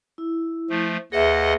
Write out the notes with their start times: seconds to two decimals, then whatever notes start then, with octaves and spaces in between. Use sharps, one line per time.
0.18 E4
0.70 F3 A3
1.12 D#2 G#4 B4 D#5 E5 F#5